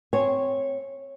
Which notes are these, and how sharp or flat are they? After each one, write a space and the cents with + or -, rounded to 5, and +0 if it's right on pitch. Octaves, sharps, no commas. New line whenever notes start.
C4 -10 C#5 -10 G#5 +0